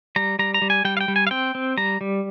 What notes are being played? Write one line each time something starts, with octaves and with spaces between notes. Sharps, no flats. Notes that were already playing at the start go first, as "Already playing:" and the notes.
G3 A#5
G3 A#5
A#5
G3
G#5
G3 G5
F5
G5
G3
G#5
F5
C4 G5
C4
G3 A#5
G3